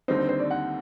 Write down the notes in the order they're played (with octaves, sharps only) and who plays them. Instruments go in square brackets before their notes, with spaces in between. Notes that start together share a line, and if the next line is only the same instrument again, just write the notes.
[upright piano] D#2 D3 G3 C4 D#4 [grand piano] C5
[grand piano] C5
C5
D5
F#5